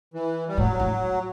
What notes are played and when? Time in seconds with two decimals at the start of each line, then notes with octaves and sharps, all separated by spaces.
0.14 E3
0.48 G3
0.58 A2 F#3
0.80 A2